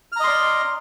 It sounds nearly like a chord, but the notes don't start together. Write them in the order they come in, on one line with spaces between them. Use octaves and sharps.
F6 A#5 D#5 C6 D5